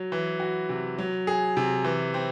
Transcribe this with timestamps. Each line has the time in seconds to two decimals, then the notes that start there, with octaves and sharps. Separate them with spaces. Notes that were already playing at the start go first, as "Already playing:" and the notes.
Already playing: F#3
0.12 E3
0.40 F#4
0.69 C3
0.98 F#3
1.27 G#4
1.57 C3
1.84 E3
2.14 C4